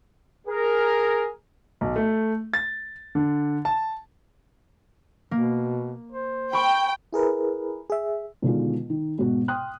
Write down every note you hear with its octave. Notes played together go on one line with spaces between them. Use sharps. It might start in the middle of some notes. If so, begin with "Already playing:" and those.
G#4 A#4
B1
A3
A6
D3
A5
B2 A#3
C5
G5 B5 C#6
E4 G#4 A#4 B4
G#4 E5
B2 D3 D#3 G#3 F4
D#3
G#2 B2 B3 F#4
G5 C6 D#6 F6 F#6